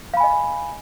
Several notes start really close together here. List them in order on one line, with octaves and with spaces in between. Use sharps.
F5 B5 G#5 D#5